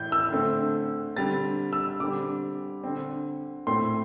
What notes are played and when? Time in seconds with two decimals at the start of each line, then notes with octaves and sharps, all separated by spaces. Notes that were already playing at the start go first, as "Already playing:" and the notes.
Already playing: A2 E3 G6
0.12 E6
0.32 D3 A3 C4
1.16 D3 G3 C4 A6
1.73 E6
2.00 D3 G3 C4 D6
2.84 D3 C4
3.67 A2 A3 C4 C6